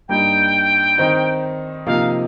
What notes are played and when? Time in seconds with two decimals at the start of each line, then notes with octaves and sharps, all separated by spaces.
0.09 G2 G3 A#3 D#4 G5
0.98 D#3 C4 D#4
1.86 C3 F3 A#3 D#4 F5